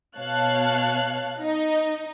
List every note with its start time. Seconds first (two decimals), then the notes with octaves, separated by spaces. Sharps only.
0.17 B2 C#5 F5 A5 F#6
1.40 D#4 D#5